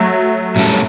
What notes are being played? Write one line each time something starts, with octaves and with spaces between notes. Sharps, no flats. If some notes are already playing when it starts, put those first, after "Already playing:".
Already playing: F#3 A3
A2 G3 C#4 F#4 A4